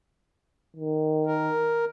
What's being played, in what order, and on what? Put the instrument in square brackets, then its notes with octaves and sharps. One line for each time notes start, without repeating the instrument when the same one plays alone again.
[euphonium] D#3
[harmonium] A#4